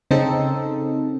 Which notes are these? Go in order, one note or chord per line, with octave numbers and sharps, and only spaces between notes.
C#3 C4 D#4 A4